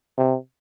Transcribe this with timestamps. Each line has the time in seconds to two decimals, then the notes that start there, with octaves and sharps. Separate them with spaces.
0.17 C3